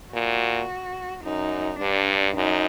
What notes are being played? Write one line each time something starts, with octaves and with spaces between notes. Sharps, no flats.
A#2 F#4
F#2 D#4
G2 D4
F#2 D#4